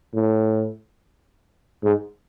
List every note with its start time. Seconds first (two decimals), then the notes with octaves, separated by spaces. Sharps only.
0.14 A2
1.83 G#2